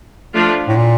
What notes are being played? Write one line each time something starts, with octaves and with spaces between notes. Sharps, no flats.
F3 A3 D4 F4
A2
A#2